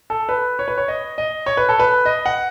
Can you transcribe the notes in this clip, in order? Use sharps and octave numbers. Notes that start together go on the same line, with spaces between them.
A4
B4
C#5
B4
C#5
D#5
D#5
C#5
B4
A4
B4
D#5
F#5